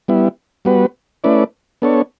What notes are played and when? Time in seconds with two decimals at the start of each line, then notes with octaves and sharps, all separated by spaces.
0.08 G3 B3 E4
0.65 G3 B3 F#4 B4
1.24 A3 C#4 E4 B4 D5
1.82 B3 D4 A4 C#5